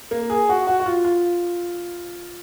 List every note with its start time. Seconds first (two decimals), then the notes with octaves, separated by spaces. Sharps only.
0.11 A#3
0.30 G#4
0.49 F#4
0.67 F#4
0.80 F#4
0.86 F4
1.05 F4